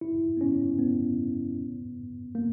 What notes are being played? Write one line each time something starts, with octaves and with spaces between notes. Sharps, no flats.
E4
B3
C#4
B3
A#3